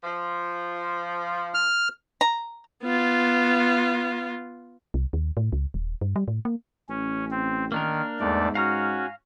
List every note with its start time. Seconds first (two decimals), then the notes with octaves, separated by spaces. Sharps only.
0.03 F3
1.54 F6
2.21 A#5
2.83 B3 F4
4.94 C2
5.13 D#2
5.37 A2
5.52 C#2
5.74 D#1
6.01 G2
6.16 G3
6.28 A2
6.45 A#3
6.89 A1 C#4
7.30 C4
7.72 D#3 A#3 D4 A#4
8.20 E2 G#2 A3 D5
8.55 C#4 F#4 F5 A#5 F6